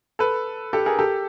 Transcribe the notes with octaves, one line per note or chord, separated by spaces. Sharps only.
A4 B4
G4 A4
G#4 A#4
G4 A4